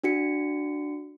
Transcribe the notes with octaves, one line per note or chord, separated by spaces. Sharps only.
D4 F#4 C#7